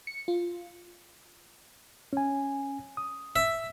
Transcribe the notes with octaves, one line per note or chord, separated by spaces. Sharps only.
C#7
F4
C#4 G#5
D#6
E5